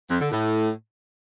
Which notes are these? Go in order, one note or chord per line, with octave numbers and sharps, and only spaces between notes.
F2
D3
A2